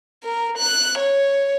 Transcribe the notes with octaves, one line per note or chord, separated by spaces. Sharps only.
A#4
F#6
C#5